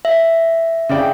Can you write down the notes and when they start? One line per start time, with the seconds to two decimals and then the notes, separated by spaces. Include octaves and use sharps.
0.05 E5
0.89 C#3 D5 G5